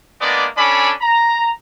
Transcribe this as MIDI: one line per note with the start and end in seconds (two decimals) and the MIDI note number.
0.20 0.46 56
0.20 0.46 58
0.20 0.46 59
0.20 0.46 62
0.20 0.46 74
0.57 0.92 61
0.57 0.92 62
0.57 0.92 69
0.57 0.92 74
0.57 0.92 80
0.57 0.92 83
1.02 1.49 82